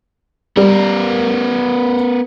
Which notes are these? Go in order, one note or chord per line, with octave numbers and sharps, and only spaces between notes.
G3 B3 A#4